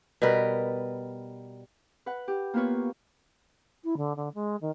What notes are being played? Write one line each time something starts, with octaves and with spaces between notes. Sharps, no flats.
B2 G3 A#4 B4
B4 F#5
G4
A#3 B3 F4 B4 C#5
E4
D3
D3
G#3
D#3